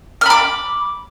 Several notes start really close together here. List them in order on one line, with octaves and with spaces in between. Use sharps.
F6 B5 D6